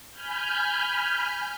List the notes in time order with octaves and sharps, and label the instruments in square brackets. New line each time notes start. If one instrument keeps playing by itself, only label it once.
[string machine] G#5 B5 F6 G6